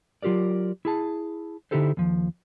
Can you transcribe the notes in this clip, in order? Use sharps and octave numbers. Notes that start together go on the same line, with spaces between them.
F#3 F4 G4 A#4 D5
E4 G#4 A5
D3 D#4 E4 G4 A4 C5
D#2 F3